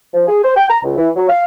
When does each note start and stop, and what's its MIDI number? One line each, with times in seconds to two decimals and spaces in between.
0.14 0.24 53
0.28 0.39 68
0.44 0.53 72
0.56 0.66 79
0.69 0.78 82
0.83 0.96 37
0.97 1.09 52
1.16 1.29 54
1.29 1.43 77